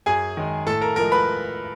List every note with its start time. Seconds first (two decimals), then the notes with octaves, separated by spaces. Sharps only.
0.06 F#2 G#4 G#5
0.37 D#3 G#3
0.67 A2 A4 A5
0.81 A#4 A#5
0.96 F3 G#3 A#4 A#5
1.12 B4 B5